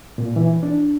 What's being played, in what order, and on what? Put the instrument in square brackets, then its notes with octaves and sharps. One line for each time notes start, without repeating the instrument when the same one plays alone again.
[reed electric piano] A#2
E3
D4